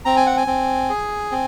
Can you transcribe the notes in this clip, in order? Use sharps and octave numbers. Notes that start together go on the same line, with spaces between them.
C4 A#5
G#5
F#5
G#5
C4
G#4
C4